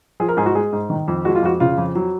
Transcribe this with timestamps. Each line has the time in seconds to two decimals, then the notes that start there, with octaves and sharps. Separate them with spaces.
0.20 F3 G#4
0.28 A#4
0.37 G#2 G#4
0.46 F#4
0.55 G#3 G#4
0.73 G#2
0.90 D#3
1.08 F2
1.25 G#3 F#4
1.35 F4
1.43 F2 F#4
1.60 C#3 F4
1.78 F2
1.95 F#3